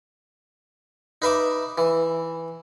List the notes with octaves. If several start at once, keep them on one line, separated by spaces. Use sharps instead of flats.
D#4 B4 E5 D6
E3